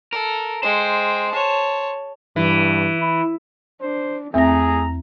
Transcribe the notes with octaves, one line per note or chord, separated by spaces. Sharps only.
A4 A#4
G#3 C5 G5
C#5 A5
G2 E3
E4
D4 C5
E2 A3 C4 G#4 E5 A#5 A#6